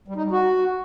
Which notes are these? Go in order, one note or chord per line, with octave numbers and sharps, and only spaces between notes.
G3
D#4
G3
F#4